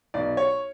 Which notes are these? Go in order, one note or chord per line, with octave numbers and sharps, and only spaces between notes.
B1 D5
C#5